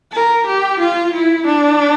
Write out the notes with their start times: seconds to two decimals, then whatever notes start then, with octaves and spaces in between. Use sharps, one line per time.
0.12 A#4
0.46 G4
0.79 F4
1.13 E4
1.46 D4